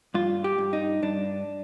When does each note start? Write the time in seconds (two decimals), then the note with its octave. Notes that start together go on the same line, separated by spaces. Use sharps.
0.14 G2 F4
0.44 G4
0.58 G2
0.73 D#4
1.02 G2 D4